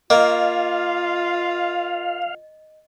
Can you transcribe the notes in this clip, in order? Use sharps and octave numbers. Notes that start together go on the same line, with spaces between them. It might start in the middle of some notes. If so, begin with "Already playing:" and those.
A#3 F4 D#5 F5